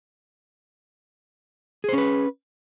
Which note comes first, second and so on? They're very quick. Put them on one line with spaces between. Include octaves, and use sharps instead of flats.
G#4 C5 C#4 B4